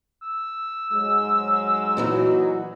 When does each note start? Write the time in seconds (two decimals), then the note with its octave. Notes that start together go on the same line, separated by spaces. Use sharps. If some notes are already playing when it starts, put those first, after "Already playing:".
0.22 E6
0.91 G#2 F#3 G#3
1.97 A#2 E3 F#3 D#4 F#4